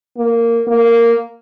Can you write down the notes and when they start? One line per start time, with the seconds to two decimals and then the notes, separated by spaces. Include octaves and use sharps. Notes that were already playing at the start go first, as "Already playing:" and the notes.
0.18 A#3
0.67 A#3